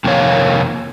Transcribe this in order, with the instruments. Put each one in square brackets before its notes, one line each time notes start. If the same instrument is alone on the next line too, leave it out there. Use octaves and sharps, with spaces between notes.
[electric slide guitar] F2 C3 D#3 A#3 C#5 F5